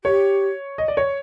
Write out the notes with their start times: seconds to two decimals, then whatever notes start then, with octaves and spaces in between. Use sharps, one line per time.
0.04 G4 C#5
0.78 D#5
0.88 D5
0.97 C#5